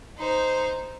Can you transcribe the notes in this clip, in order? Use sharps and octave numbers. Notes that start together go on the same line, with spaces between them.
D#4 C5